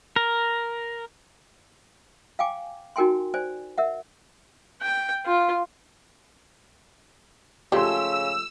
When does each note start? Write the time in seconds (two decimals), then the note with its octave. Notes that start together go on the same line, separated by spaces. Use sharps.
0.16 A#4
2.39 F5 G5 G#5 D6
2.96 D#4 F#4 A#4 G5 G#5 C6
3.34 C5 D5 G#5
3.78 A#4 E5 F#5
4.82 G5
5.25 F4
7.72 C#3 F3 G#3 A3 G4 C6 E6